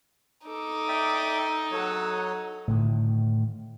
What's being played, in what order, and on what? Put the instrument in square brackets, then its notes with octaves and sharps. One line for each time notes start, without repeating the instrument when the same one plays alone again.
[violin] D#4 [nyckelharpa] A4 D6
[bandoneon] D5 E5 G5
[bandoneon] F#3 C#5 [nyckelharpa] A4 F#5
[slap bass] A2 D3 D#3